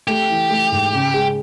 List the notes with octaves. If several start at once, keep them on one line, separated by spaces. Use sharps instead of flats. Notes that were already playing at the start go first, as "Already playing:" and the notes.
A3 G4
E3
A3
G#2
C#3
G#3